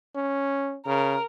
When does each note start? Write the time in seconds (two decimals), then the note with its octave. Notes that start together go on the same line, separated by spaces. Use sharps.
0.15 C#4
0.87 C#3 A#4